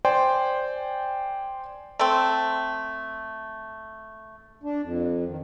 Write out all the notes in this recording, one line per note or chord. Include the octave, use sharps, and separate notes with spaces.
C5 D5 G5 G#5 C6
A3 C4
D4
F2
D#3